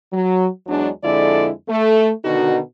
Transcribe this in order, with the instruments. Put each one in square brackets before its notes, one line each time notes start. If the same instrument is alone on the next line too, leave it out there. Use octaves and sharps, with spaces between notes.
[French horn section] F#3
E2 F#3 G#3 D4
F2 D3 G#3 E4 A4 D5
A3
B2 D3 D#3 D#4 F#4